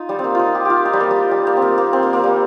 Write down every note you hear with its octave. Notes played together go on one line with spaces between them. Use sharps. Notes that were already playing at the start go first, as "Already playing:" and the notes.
Already playing: D#4 F4
G3
C4
A#3
D#4 F4
G4
F4 G4
D#4
G3
A#3
G3
G3
A#3
C4
A#3
A#3
C4
A#3
A#3
G3